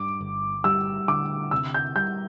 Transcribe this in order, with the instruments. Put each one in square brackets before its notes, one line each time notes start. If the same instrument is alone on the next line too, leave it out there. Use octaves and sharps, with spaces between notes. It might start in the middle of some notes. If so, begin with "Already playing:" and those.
Already playing: [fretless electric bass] G2 [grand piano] D6
[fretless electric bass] G1
[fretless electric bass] G3 [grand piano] E6
[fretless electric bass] D3 [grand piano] D6
[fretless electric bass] C3 [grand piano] E6
[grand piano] G6
[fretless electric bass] G3 [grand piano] G6